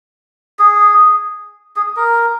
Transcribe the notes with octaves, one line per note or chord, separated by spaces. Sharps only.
G#4
G#4
A#4